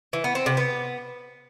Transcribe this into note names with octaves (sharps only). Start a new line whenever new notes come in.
E3
B3
C4
C3
B3